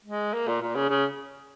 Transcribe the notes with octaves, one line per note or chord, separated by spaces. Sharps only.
G#3
A#3
A#2
A#2
C#3
C#3